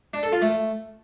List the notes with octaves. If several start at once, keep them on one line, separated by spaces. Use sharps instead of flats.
D4
A4
F4
A3